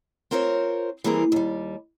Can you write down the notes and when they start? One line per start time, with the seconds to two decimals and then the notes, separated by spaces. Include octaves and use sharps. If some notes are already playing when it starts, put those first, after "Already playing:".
0.31 C4 F4 A#4 C5 C#5
1.04 E3 G3 A#3 C4 G#4 A#4
1.32 D#2 G3